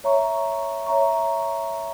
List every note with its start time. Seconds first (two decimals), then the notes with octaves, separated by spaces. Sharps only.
0.04 C#5 E5 A#5 C#6
0.86 C#5 E5 A#5 C#6